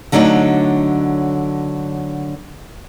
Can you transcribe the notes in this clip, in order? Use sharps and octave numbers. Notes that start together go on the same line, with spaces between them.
D3 F#3 A3 D4 D#4 C#5